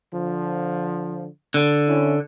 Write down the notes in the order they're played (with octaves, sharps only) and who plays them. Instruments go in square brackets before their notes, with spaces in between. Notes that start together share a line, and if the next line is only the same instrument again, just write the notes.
[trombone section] D3 F3
[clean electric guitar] D3
[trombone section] C#4 E4